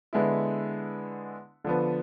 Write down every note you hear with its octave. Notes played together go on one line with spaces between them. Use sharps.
D3 G#3 B3 E4
D3 F3 B3